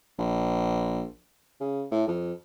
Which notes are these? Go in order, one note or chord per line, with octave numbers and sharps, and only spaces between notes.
A#1
C#3
A2
F2